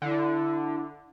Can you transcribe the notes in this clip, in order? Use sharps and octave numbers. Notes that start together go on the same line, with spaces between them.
D3 E4